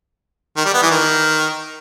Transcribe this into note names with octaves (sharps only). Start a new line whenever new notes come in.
D#3
G3
B3
E3
D#3